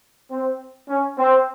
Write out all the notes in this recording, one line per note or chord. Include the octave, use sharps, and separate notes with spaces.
C4
C#4
C4